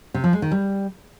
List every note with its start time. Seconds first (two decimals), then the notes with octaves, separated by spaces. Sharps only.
0.14 C3
0.24 F3
0.33 G#3
0.42 D#3
0.52 G3